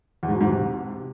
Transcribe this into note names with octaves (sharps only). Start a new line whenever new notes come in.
E2
G#2
B2
G#2
C3